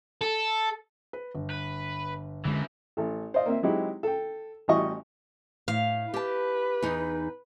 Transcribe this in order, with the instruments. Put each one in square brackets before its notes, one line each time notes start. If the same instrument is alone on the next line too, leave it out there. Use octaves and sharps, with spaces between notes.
[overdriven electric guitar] A4
[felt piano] B4
G1
[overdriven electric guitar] B4
[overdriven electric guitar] F#2 E3 [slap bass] D3 G#3
[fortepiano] A1 A4
C5 D5 D#5 F5
A#3 C4 E5
F#3 G#3 C4 D#4 E4 G4
A4 G5
A1 E3 G3 F#4 D#5 C#6
[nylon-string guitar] A2 [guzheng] F5
[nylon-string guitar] G4 A5 [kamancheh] B4
[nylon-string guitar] E2 D#4